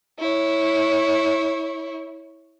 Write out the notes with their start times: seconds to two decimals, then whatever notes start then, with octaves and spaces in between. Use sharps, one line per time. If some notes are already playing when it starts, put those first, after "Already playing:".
0.19 E4 C#5